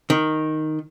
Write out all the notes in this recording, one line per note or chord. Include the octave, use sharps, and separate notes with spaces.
D#3